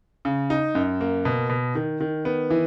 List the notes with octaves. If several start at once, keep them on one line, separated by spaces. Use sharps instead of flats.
C#3
D#4
F#2
A#3
B2
B2
D#3
D#3
B3
E3